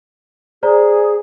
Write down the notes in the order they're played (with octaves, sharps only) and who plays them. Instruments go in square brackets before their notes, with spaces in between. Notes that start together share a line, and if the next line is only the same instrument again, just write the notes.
[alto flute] G#4 [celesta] C5 D5 A#5